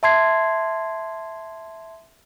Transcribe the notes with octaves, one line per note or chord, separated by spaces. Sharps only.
E5 A5 C6 G#6 C7